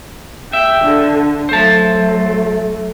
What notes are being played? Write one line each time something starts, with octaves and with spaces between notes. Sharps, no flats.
E5 G5
D3
F#3 A3 C5 A5